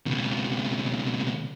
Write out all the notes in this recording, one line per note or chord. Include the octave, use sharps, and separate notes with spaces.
C#2 B2